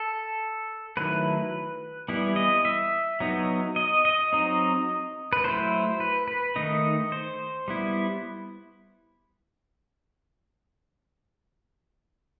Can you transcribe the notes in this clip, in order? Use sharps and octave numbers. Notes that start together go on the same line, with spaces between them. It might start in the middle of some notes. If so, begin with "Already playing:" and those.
Already playing: A4
D#3 F#3 A3 E4 B4
E3 G3 B3 E4
D#5
E5
F#3 B3 D#4
D#5
D#5
F#3 C4 D#4
B4
F#3 A3 E4 C5
B4
B4
D#3 A3 D#4 D#5
C5
G3 B3 E4